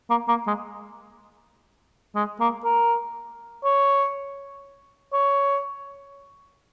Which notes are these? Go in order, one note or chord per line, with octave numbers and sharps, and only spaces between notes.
A#3
A#3
G#3
G#3
A#3
A#4
C#5
C#5